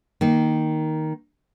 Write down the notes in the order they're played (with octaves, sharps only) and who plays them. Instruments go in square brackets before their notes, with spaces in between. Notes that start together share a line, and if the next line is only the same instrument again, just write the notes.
[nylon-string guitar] D#3 A#3 D#4